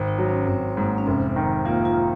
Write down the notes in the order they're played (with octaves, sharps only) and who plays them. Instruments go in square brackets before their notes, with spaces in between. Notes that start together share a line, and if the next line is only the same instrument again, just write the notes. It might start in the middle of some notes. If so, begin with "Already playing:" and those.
Already playing: [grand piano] G#1
[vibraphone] D#4
[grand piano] F#3
[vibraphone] C#4
[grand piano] G#1 [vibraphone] C4
[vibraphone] C4
[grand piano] G#2 [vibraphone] A#3
[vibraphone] C#4
[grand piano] F1 [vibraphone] C4
[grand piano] D#3
[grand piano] A#3 [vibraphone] F4
[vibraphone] F4